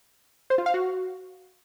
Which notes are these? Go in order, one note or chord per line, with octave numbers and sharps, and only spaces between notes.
C5
F4
F5
F#4